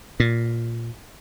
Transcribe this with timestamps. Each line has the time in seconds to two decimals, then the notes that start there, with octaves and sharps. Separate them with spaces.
0.20 A#2